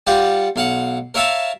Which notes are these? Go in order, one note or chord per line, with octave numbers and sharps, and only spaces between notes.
G3 F4 G4 F#5
B1 F5 F#5
A#4 C#5 E5 F5 G#5 A5